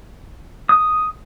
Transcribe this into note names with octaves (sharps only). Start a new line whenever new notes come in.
D#6